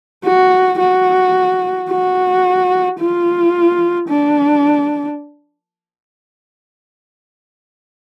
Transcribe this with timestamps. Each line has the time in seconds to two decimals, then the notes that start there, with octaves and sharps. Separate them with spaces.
0.25 F#4
0.79 F#4
1.90 F#4
2.99 F4
4.09 D4